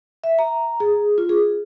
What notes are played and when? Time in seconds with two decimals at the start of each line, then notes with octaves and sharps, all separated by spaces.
0.24 E5
0.39 A#5
0.80 G#4
1.18 F4
1.29 G#4